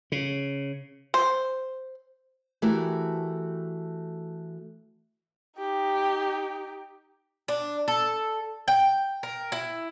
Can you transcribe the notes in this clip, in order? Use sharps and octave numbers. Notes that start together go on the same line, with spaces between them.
C#3
C5
E3 A3 F#4 G4 A#4
D#4 G4
D4
A4
G5
A#4
E4